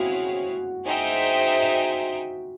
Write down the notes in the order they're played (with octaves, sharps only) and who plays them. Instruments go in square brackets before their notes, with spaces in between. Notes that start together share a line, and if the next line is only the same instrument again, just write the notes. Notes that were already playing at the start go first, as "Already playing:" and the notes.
Already playing: [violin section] C4 E4 G#4 C#5 F5 [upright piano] F#4
[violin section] D#4 G#4 C5 E5 G5